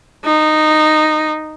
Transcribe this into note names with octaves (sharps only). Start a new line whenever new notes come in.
D#4